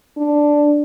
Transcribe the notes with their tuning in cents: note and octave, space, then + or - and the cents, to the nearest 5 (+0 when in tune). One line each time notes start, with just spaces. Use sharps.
D4 +0